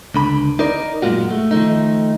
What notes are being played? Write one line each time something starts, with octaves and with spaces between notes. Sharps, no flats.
C#2 D3 B5
D#4 A#4 D5
F#2 A#2 D#3 G#3 F4 F#4
A3
D#3 F3 A3 D#4